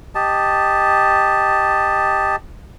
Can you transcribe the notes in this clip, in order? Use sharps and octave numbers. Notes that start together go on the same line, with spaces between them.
G4 D#5 A5